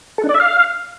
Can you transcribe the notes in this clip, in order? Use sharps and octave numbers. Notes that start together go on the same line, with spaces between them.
A4
D4
D5
E5
F5